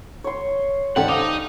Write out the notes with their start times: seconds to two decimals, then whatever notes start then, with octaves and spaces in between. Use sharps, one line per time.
0.24 C#5 C6
0.96 G#1 C#4 G4 A4 D5 F#5
1.08 D#4 C5 F5 D6